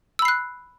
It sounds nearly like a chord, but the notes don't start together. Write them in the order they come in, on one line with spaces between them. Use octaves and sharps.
E6 B5 C7 F#6